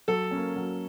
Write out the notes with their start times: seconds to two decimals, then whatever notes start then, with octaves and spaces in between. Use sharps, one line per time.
0.08 F#3 A4
0.31 A#3 C#4
0.56 F#3